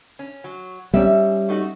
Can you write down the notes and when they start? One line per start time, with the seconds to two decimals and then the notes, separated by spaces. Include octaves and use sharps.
0.19 C#4
0.44 F#3
0.94 G#2 G3 B3 C#4 E5
1.49 A3 D#4 F#4